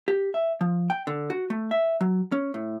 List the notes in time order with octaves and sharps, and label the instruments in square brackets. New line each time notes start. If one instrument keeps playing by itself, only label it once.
[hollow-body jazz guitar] G4
E5
F3
G5
D3
F#4
A3
E5
F#3
C#4
A2